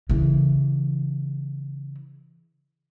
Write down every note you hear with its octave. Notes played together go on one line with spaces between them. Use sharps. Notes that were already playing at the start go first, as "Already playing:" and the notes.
C#3 E3